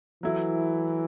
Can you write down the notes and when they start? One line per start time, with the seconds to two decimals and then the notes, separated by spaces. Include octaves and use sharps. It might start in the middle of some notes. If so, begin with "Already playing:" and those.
0.22 E3 F#3 A3 E4